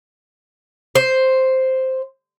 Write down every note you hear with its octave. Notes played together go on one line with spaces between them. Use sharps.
C5